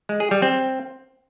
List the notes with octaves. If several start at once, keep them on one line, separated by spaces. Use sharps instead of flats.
G#3
G#4
G3
C4